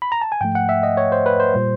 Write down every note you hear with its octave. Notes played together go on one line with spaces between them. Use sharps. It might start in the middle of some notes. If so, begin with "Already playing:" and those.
B5
A#5
A5
G#5
G#2 F3 A3 G5
F#5
E5
D#5
C#5
C5
B4
C5
A#2 G3